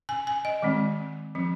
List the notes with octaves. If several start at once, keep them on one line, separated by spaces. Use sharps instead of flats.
G#5
G#5
D#5
D#3 G#3 C4
F3 C4